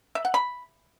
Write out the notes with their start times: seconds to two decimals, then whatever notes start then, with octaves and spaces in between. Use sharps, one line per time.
0.15 E5
0.25 F#5
0.34 B5